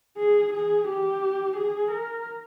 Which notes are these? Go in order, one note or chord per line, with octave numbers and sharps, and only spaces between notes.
G#4
G#4
G4
G#4
A#4